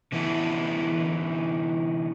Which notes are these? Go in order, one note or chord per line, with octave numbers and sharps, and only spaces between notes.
D3 E3 B3 E4 A4